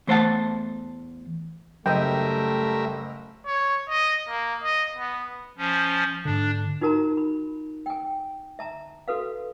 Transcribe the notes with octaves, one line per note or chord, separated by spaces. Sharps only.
E2 A3 C5 D5 F#5 A5
F#1 G3 A3 A#4 D#5 E5 G5
C#5
D#5
A#3
D#5
B3
F3 C#4
G#2 D3 D4
D#4 F4 F#4 A#4 A5 A#5
B5
G5 G#5
E5 A5 A#5
F#4 A4 B4 F5